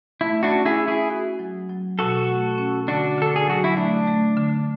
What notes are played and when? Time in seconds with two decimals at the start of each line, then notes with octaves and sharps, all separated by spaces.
0.21 A3 E4
0.43 D4 F#4
0.51 C#4
0.66 E4 G#4
0.80 C#4
0.88 E4 G#4
1.10 F#4
1.39 F#3
1.69 F#3
1.99 B2 F#4 A4
2.28 A3
2.58 C#4
2.88 D3 D4 F#4
3.18 D3 A4
3.36 G#4
3.47 F#3 F#4
3.64 E4
3.77 A3 D4
4.07 A3
4.37 D3